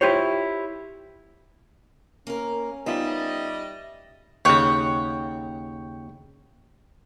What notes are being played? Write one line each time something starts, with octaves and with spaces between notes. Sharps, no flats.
E4 F4 G4 C5 C#5
A#3 C#4 A#4
G3 B3 D#4 F4 D#5 E5
D#2 C#3 C#5 F#5 G5